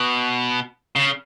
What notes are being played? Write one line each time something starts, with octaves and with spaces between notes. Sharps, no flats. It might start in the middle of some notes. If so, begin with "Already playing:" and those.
Already playing: B2
C#3